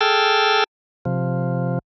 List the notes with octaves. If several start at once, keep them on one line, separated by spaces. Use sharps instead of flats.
G#4 A4 G5 A5 E6 F6
C3 F3